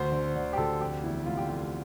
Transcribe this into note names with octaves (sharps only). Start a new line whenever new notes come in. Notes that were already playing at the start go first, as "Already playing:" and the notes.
Already playing: D2 C5
D3
D3
G4
D2 A4
F1 G4
E2 E4
F1 F4
G4
F1 F4